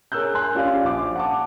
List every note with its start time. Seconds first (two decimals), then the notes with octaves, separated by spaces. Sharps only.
0.12 G#4 A#4 C#5 E6 F#6 G6
0.34 G#5 C6 F#6
0.55 C#4 F4 G4 D5 F5
0.85 A#1 D6
1.16 F#5 A5 D6